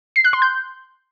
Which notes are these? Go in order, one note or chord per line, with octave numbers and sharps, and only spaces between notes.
C7
F#6
C6
G6